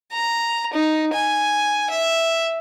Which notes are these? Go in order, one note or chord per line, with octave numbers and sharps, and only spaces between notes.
A#5
D#4
G#5
E5